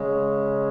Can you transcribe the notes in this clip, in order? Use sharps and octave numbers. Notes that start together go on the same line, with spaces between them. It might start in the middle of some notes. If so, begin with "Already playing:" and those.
Already playing: C#3 G#3 C#4